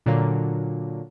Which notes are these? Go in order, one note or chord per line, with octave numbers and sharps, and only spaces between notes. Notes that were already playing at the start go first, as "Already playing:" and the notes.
A#2 D3 F#3 A#3